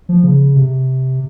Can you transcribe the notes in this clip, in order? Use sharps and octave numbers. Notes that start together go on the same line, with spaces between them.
F3
C#3
C3